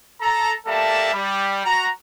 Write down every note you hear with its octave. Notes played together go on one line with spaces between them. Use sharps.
A4 A#5
G3 A#3 A4 E5 A5
G3
F#4 A#5